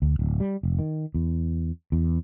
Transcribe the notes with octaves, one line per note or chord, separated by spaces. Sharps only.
D2
D1
G3
F1
D#3
E2
E2